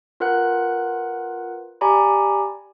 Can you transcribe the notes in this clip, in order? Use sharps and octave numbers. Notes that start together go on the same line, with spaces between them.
F4 A#4 B4 F#5 F#6
G4 D5 G#5 A#5 B5